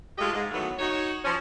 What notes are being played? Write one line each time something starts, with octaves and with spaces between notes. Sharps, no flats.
G#3 A3 F4 G4 A4 D#5
G#2
D#3 E3 F#3 A3 B3
D#4 F#4 C#5
F3 C#4